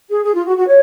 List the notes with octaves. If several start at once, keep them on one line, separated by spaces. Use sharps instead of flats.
G#4
G#4
F4
F#4
F#4
C#5